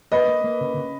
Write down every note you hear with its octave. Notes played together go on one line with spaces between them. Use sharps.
A#3 B4 D#5
A#3
A#3
C#3
C#3